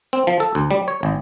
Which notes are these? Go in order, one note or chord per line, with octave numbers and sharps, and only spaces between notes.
C4
F3
A4
D2
G3
C#5
G#1